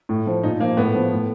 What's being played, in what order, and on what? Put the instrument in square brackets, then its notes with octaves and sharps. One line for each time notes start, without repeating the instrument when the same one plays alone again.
[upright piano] A2
F3
A#2 D#4
F3 A#3
A2 B3
F3
A2